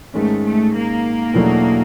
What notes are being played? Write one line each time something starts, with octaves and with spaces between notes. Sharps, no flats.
G#2 D#3 G#3 A3 C#4
A3
A#3
E2 B2 F#3 A3 D4